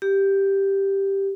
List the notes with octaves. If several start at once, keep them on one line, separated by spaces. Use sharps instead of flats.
G4